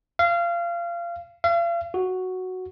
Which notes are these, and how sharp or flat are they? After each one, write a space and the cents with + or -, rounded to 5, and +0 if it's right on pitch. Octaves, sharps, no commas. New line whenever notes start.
F5 -25
F5 -40
F#4 +0